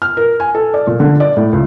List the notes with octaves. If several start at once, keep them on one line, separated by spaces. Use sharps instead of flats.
F6
A#4
G#5
A4
D5
A#2
D3
D5
A2
C#2